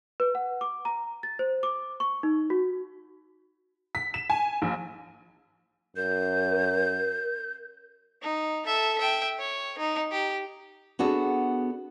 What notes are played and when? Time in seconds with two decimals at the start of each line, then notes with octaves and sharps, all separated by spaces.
0.20 B4
0.35 F#5
0.61 D6
0.85 A#5
1.23 A6
1.39 C5
1.63 D6
2.00 C#6
2.23 D#4
2.50 F#4
3.95 B6
4.14 E7
4.30 G#5
4.62 A#1
5.96 F#2 A#4 G6
8.22 D#4
8.66 A4 E5
8.98 E5 G5
9.39 C#5
9.78 D#4
10.11 G4
10.99 B3 D4 F#4 G#4 A4